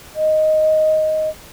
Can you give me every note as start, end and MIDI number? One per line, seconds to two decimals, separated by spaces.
0.15 1.29 75